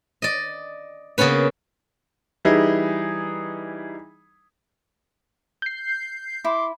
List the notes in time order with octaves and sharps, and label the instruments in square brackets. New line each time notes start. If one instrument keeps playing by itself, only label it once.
[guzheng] D5 D#5
C#3 A#3 B3 C#4 B4
[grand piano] E3 G3 D#4 E4 G#4
[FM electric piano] G6 C7
[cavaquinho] E4 [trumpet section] C6 D6